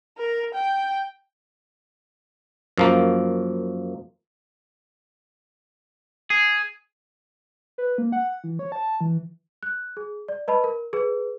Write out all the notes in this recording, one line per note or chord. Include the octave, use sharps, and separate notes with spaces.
A#4
G5
F#2 F3 A#3
G#4
B4
A#3
F#5
E3
C#5
A5
E3
F#6
G#4
D5
B4 D#5 A5 B5
A#4
G#4 B4